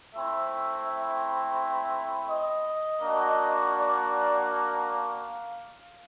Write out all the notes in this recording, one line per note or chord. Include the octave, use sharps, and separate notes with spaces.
A3 C4 E4 E5
E5
D#5
A#3 D4 F#4
D5
F5